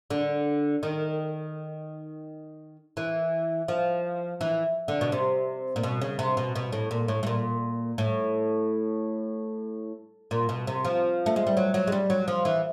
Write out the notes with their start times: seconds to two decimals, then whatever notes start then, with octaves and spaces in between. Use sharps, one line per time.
0.10 D3
0.83 D#3
2.97 E3
3.68 F3
4.41 E3
4.88 D3
5.01 B2
5.12 C3
5.76 A#2
5.83 B2
6.02 C#3
6.19 C3
6.37 B2
6.56 B2
6.73 A2
6.91 A#2
7.08 A2
7.23 A2
7.27 A#2
7.98 A2
10.31 A#2
10.49 B2
10.67 C3
10.85 F3
11.26 A3
11.36 G#3
11.47 G3
11.57 F#3
11.74 F#3
11.87 G#3
11.92 G3
12.10 F#3
12.28 F3
12.45 E3